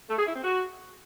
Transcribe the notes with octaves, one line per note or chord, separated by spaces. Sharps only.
A3
G#4
E4
C4
F#4